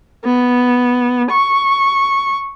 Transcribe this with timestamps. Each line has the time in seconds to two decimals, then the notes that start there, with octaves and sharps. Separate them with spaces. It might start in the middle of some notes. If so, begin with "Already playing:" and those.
0.25 B3
1.31 C#6